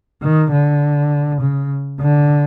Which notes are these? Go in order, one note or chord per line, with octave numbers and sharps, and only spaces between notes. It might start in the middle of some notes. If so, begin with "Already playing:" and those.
D#3
D3
C#3
D3